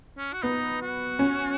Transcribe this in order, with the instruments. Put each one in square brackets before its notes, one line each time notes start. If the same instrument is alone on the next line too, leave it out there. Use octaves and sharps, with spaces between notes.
[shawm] C#4
F#4
[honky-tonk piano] B3 [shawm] D#4
[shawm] F#4
[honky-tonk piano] C#4